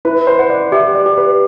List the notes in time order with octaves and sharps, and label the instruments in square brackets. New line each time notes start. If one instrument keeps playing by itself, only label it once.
[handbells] E4 [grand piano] B4
[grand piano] C5
[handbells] F#5
[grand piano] D5
[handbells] G4 [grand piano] E5
[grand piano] D5
[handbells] G4
[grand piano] B4